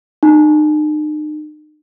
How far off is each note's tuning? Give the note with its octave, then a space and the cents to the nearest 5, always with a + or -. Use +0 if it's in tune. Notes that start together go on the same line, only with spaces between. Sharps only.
D#4 -40